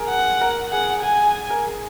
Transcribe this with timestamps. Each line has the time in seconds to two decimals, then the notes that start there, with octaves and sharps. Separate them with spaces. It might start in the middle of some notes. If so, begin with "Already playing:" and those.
Already playing: G#4 A#4
0.09 F#5
0.41 A#4
0.72 G#4 F#5
1.03 G#4 G#5
1.50 A#4
1.66 G#4